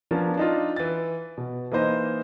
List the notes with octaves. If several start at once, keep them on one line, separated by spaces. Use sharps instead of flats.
F3 B3 C#4 D4 A#4
D4 D#4 F4
E3 A6
B2
E3 A#3 D#4 C5 D#5